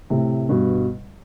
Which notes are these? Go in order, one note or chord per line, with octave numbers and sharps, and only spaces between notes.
A2 C3
G2 B2